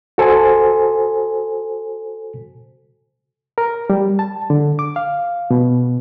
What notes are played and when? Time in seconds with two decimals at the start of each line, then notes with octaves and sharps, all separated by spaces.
0.18 F#4 A4 C5 G#5
3.58 A#4
3.90 G3
4.19 A5
4.50 D3
4.79 D6
4.96 F5
5.51 B2